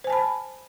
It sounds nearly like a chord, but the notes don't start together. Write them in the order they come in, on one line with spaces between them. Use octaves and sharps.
C5 G#5 A5 B5